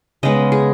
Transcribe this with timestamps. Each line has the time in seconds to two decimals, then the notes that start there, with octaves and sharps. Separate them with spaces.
0.23 C#3 G#3 B3 D#5
0.52 G#4